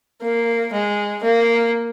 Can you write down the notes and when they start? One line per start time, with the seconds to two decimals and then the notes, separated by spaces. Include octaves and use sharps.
0.21 A#3
0.73 G#3
1.24 A#3